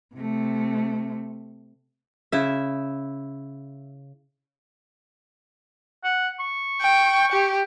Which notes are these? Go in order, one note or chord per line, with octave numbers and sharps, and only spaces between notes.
C3 A3
C#3 E4 E5
F#5
C#6
G5
G4